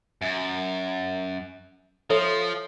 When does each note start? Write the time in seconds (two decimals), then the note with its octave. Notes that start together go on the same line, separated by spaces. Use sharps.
0.22 F#2
2.10 F3 A4 C#5 E5